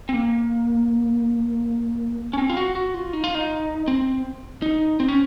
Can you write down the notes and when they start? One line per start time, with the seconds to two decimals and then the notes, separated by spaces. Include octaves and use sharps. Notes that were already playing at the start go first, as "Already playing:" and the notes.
0.09 C4
0.14 A#3
2.33 C#4
2.38 C4
2.50 F4
2.57 F#4
2.75 F#4
2.94 F4
3.13 D#4
3.24 F4
3.35 D#4
3.88 C4
4.62 D#4
5.00 C4
5.08 C#4